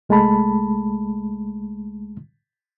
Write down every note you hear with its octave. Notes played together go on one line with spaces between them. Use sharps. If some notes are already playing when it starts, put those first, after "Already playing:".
C2 G#3 A3 A5 B5